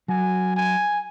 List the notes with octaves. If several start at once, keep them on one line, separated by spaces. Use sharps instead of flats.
F#3 F#4 G#5
G#5